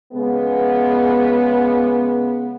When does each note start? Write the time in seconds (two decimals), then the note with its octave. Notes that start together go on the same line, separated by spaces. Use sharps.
0.13 C#3 G#3 B3